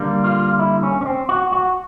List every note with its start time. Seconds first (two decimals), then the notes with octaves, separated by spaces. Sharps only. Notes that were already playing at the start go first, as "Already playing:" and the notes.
Already playing: D3 G3 A#3
0.24 F4
0.59 E4
0.83 C#4
1.01 C#4
1.06 C4
1.29 F#4
1.52 F#4